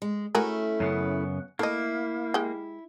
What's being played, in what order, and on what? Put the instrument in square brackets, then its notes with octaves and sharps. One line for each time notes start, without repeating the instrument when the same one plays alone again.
[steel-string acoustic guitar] G#3
[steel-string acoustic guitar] A3 C#4 E4 [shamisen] F#4 G#4 A#4
[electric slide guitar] F#2 C#3 B3
[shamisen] A3 D#5 [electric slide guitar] A#3 [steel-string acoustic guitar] E4
[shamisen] G#3 G4